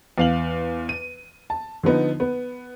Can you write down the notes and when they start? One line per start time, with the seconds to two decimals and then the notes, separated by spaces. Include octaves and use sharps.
0.18 E2 F5 F#7
0.89 D#7
1.50 A5
1.83 D3 F3 B3 D#4
2.20 B3